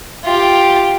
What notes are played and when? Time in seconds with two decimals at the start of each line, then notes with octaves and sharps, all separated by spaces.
0.24 F4 G4